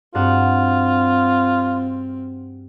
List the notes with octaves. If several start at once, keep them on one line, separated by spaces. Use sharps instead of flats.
G2 C4 F4 F#4 F#5